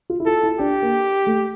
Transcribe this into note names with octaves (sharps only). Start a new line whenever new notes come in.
F4
E4
F4 A4
E4
D4 G4
A#3
A3